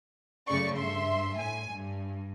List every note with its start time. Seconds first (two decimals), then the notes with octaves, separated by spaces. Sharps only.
0.47 F#2 C#3 A3 D5 C#6
0.77 G2 E5 C6
1.38 A2 G#5
1.73 G2